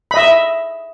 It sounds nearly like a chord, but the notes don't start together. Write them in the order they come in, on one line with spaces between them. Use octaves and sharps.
B5 D#5 E5